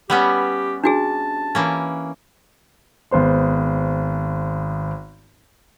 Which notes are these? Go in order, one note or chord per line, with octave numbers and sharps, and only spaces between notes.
G3 B3 C#4 G4
D4 F#4 G#4 A5
E3 A#3 C#4
G#1 B3 C5 C6